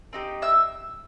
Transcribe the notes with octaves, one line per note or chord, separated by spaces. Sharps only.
C4 D#4 G4
E5 E6